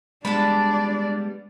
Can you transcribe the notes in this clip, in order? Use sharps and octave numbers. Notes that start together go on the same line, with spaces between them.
G3 G#3 B3 D4 D5 A5 B5